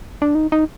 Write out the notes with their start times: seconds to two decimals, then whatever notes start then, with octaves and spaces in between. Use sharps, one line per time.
0.22 D4
0.35 D#4
0.52 D#4